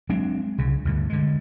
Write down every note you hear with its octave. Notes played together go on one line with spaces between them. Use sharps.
F#3 G#3 C4 D4
C2 C#3
D2 G2 D3
D3 G#3